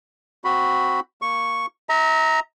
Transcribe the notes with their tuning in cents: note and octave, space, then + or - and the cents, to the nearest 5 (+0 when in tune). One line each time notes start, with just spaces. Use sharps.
C4 -5 F#4 +0 B5 +5
A#3 +0 C#6 +0
E5 -40 A#5 +0